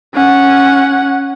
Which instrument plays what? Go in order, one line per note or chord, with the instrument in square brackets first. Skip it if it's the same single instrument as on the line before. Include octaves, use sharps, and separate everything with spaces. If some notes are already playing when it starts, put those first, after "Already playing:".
[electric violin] C#4 F#5